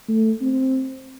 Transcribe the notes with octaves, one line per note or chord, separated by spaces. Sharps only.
A3
C4